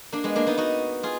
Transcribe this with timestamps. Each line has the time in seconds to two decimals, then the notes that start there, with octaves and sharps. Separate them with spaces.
0.12 A#3 D4
0.24 G#3 B3
0.36 A#3 D4
0.47 B3 D#4
0.58 D#4 F#4
1.03 F4 G#4